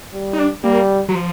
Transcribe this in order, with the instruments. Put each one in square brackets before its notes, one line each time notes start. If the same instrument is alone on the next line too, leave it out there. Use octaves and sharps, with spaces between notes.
[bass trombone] G3
[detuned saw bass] D#4
D4
[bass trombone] G3 [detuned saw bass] A#3
[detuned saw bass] F#3
F3